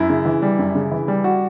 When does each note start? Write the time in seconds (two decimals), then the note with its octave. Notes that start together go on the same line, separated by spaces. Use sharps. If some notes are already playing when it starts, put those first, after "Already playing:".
Already playing: F#2 E4
0.09 C#3
0.25 E3
0.42 G3
0.59 F#2
0.75 C#3
0.91 E3
1.08 G3
1.24 F#4